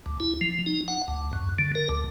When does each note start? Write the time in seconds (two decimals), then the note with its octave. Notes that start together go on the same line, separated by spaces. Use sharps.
0.06 D2
0.20 E4
0.41 F3
0.66 D#4
0.88 F#5
1.08 D2
1.33 F#2
1.59 D3
1.75 A#4
1.89 D2